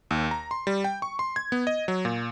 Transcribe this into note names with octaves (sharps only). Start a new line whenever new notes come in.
D#2
A#5
C6
G3
G5
C#6
C6
G#6
B3
D#5
F#3
A#2